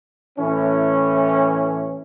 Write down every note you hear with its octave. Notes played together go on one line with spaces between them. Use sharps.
A2 E3 C#4